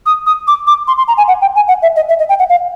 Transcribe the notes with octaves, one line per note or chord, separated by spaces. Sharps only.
D#6
D#6
D6
D6
C6
C6
A#5
G#5
F#5
G5
G#5
F#5
E5
D#5
E5
D#5
G5
F#5
F5